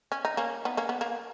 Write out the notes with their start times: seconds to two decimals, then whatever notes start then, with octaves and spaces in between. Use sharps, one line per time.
0.12 C#4
0.25 D#4
0.37 A#3 C#4
0.65 B3 D#4
0.77 A#3 C#4
0.89 B3
1.01 A#3